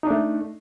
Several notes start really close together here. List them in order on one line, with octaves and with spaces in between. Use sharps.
D#4 D4 A3